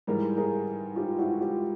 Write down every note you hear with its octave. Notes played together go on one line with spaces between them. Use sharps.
G#2 E3 G3 G#4 A#4
G#4 A#4
F4 G4
E4 F#4
F4 G4